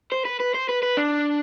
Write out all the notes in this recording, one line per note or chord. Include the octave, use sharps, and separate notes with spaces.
C5
B4
B4
C5
B4
B4
D4